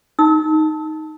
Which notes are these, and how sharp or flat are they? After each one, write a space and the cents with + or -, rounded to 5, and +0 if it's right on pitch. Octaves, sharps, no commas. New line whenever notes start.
D#4 +0 E6 -40